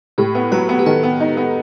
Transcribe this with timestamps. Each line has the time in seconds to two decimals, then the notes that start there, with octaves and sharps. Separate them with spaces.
0.18 A2 G4
0.35 B3
0.52 F#3 B4
0.69 B3
0.79 G4
0.86 D#3 A4
1.03 B3
1.20 D#4
1.37 B3